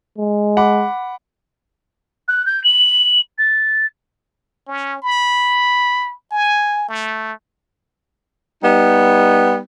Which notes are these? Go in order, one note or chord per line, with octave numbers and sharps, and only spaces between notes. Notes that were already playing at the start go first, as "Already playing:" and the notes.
G#3
F#5 B5 D6
F#6
G6
F#7
A6
C#4
B5
G#5
A3
G3 B3 D#4